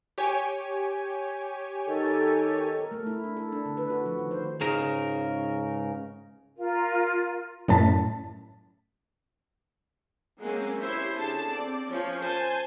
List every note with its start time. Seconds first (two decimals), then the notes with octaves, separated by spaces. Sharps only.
0.18 G4 C#5 G#5
1.87 D#3 A4
2.79 A#4
2.92 A3
3.07 E4
3.24 D4
3.37 A4
3.52 D4
3.65 D3
3.77 B4
3.90 F#4
4.06 F3
4.19 D#3
4.31 C5
4.61 C#2 G#2 C#3 A#4
6.57 F4 A#4
7.68 F#2 A2 A5 B6
10.41 F#3 G#3 A#3 C4 C#4
10.79 C#4 E4 G4 C5 C#5 E5
11.17 D3 C#4 G#4 A5
11.48 C4 D5
11.89 F3 C#4 C#5
12.22 C5 G#5 A5